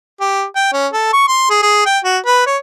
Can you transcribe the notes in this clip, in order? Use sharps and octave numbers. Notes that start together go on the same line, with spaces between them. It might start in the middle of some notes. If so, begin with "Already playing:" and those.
G4
G5
C#4
A4
C#6
C6
G#4
G#4
G5
F#4
B4
C#5